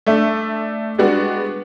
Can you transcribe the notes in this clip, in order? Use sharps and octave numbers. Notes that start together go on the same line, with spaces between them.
A3 D4 E5
G3 G#3 B3 D4 F#4